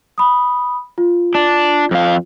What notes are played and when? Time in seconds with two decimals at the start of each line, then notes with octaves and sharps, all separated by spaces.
0.18 B5 D#6
0.98 F4
1.35 D4
1.91 F2 F5